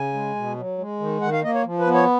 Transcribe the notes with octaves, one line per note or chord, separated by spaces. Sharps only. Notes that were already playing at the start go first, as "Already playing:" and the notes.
Already playing: C#3 G#5
G#3
B2
F#3
G#3
D#3
D#3 F#5
F5
A#3 D#5
C#5
F3
B4
B3
C#5